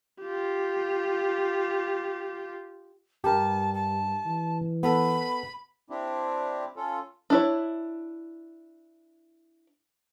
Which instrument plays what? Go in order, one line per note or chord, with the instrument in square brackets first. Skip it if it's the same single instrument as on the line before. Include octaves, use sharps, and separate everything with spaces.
[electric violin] F4 G4
[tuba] G2 [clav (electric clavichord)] G4 A#4 [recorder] A5
[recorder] A5
[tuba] E3
[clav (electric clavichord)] B3 A4 [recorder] B5
[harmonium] C4 D4 E4 G4
C#4 F4 A4
[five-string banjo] D4 E4 C#5